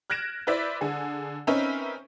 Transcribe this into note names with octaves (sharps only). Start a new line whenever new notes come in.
F6 F#6 G#6 A#6 D7 E7
E4 B4 C5 D5 E5
D3 G#4
C4 C#4 D#4 A#4 B4 E5